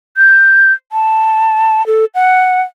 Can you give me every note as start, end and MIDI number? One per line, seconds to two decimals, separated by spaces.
0.17 0.73 91
0.92 1.85 81
1.87 2.05 69
2.15 2.62 78